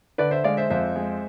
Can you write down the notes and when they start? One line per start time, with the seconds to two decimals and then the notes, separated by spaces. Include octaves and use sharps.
0.18 D3 B4 D5
0.31 C5 E5
0.44 G#3 D5 F5
0.57 C5 E5
0.70 F2 C5 E5
0.96 G#3